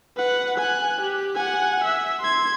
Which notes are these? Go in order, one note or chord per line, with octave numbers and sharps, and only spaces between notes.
B4 F#5
G#5 F#6
G4
F#5 G#5
E5
C6 G#6